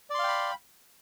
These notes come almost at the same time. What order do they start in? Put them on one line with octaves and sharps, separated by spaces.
D5 C6 F5 G5 B5